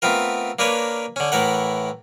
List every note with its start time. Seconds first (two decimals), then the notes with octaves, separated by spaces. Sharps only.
0.02 A3 B3 C4 F4 A#4
0.59 A#3 D4 A#4 B4 C#5
1.16 D3 C#4
1.32 A2 E3 A3 A#4 F#5